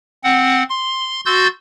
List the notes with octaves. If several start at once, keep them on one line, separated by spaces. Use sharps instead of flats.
C4 F#5
C6
F#4 C6 E6 G6 A6